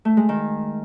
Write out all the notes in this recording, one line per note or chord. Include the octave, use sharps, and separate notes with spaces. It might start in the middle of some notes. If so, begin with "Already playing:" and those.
A3
G#3
D#3